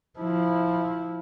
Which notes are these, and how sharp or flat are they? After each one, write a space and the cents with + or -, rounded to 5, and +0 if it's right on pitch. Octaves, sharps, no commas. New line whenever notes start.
F3 +0 E4 -15